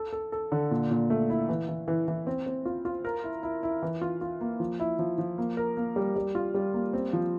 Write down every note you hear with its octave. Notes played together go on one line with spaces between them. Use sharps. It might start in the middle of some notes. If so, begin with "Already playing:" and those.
Already playing: A4
A4
A4
D3
A#2
A#2
A3
E4
E3
E3
E3
E3
C4
C4
F4
F4
A#4
E4
E4
E4
E3
F4
F4
A#3
F3
E4
F3
F3
A#3
A#4
A#3
G3
G3
F4
G3
A#3
C4
F3